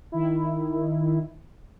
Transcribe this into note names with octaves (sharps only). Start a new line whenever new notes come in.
D#3 E4